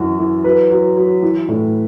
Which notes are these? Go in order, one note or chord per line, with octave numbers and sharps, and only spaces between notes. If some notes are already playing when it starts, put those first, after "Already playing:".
Already playing: F#2 E3 F#4
E3
F#3 B4
F#3
F#3
E3
A2